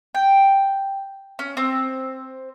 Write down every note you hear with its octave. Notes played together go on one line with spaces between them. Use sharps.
G5
C#4
C4